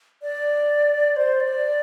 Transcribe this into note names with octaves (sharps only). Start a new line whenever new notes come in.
D5
C5
D5